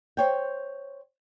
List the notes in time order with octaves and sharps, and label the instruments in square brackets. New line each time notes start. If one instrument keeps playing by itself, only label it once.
[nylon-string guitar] C5 C#5 G5